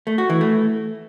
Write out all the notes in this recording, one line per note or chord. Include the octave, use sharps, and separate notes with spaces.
A3
F#4
E3
A3